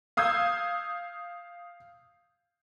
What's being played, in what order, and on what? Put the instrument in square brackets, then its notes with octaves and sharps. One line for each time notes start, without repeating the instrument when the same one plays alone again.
[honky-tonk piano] F5 D#6 E6 G6 G#6